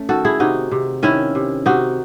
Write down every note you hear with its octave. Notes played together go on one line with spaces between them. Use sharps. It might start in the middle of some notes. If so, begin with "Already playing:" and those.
Already playing: A3 C#4
D#3 F#4 A4
E4 G#4
C3 D#4 F#4
C3
D#3 C#4 E4
C3
C3 D#4 F#4